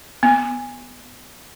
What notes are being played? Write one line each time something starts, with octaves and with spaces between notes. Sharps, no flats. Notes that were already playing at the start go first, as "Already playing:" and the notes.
B3